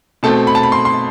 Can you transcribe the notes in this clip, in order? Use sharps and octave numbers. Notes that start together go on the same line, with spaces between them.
B2 A3 C4 A5
B5
A5
B5
C6
C6